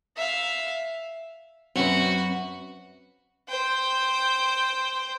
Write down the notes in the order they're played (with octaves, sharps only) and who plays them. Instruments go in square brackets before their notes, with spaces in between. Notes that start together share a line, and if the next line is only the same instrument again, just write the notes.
[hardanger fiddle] E5 F5
[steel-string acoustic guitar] F#2 B4 [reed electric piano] C4 C#4 [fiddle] F#4
[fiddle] C5 G5